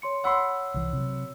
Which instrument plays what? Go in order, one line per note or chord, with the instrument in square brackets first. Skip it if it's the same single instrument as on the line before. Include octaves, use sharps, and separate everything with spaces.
[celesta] C#5 C6 C#7
[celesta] C#5 E6 [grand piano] F#5 B5 C6
[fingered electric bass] C2 E3
C3 F#3